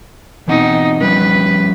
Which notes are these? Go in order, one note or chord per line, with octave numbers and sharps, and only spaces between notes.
B2 E3 C4 D#4 F#5
F3 G3 C#4 B4